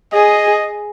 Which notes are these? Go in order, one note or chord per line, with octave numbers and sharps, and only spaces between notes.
G#4 D#5